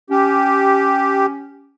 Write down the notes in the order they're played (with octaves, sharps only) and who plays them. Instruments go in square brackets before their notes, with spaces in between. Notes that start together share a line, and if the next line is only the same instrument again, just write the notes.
[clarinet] C#4 [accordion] G4